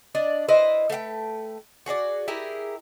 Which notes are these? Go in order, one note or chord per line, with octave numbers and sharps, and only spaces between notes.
D4 D5 D#5
E4 B4 C5 D#5
A3 B4 F5 G5
F#4 G#4 C#5 D5
E4 G4 G#4 A#4